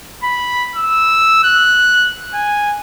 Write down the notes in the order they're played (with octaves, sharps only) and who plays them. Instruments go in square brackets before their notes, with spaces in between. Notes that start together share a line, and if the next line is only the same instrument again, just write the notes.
[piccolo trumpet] B5
E6
F#6
G#5